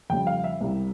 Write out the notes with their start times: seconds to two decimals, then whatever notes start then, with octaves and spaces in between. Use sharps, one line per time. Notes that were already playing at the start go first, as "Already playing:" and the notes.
0.10 F2 C#3 G3 G5
0.27 F5
0.44 E5
0.61 C2 C3 G3